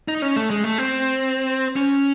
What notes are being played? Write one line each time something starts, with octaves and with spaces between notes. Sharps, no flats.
D#4
C#4
A3
G#3
A3
C4
C#4